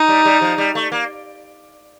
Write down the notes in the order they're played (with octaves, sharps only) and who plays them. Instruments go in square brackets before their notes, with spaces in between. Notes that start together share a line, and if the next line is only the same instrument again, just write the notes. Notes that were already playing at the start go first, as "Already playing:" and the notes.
Already playing: [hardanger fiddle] D#4
[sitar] G3
G3
F3
G3
A3
A#3